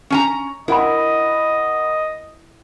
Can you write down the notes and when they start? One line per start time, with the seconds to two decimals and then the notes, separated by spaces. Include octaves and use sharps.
0.10 C#4 G#5 A#5
0.68 E4 A#4 D#5 F#5 B5